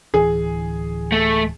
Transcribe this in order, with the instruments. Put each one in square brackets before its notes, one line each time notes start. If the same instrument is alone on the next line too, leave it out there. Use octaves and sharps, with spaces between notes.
[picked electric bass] D1 E3 [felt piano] G#4
[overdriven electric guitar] A3